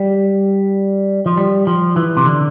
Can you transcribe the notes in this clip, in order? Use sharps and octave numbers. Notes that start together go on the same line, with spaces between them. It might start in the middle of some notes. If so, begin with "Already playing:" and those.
Already playing: G3
F3
G3
F3
E3
C3
D3